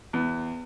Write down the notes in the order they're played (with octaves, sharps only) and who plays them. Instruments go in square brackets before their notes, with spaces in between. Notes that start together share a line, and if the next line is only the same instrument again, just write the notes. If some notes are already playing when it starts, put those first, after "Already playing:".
[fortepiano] E2